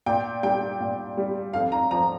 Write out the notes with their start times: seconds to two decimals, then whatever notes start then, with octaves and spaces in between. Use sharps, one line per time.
0.06 A#2 G5
0.43 G3 G5
0.80 A#2
1.17 G3
1.53 F2 F5
1.72 A#5
1.91 F3 A#5